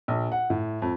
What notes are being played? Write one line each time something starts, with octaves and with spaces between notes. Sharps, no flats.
A#1
F#5
A2
F2